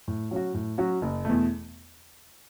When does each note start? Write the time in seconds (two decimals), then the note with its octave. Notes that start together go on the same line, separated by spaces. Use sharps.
0.08 A2
0.31 F#3 C#4 F#4
0.54 A2
0.78 F#3 C#4 F#4
1.02 F#1
1.25 E2 B2 A3